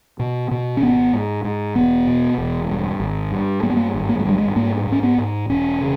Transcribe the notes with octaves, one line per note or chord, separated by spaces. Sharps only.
B2
B2
C#4
G#1 B3
G#2
G#2
E1 B3
B2
E1
G2
G#1
G2
G2 A#3
B3
A#3
G#1
A#3
G#3
G2 G3
G#3
G#2 A#3
G#2
C#4
B3
G#2
E1 C#4
C#3